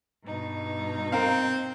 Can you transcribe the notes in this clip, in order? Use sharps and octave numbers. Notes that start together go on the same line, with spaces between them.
G2 B2 D#4
C4 A#4 F5